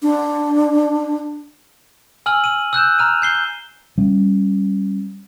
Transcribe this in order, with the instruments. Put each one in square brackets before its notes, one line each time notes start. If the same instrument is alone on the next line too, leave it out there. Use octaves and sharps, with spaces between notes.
[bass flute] D4
[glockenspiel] G#5 E6 F6 F#7
D#7 F#7
E6 F#6 G6 E7
A#5 F6 D#7
G6 C7 G7
[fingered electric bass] G3 C#4